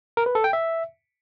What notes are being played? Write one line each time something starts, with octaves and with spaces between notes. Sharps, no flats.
A#4
B4
A4
G5
E5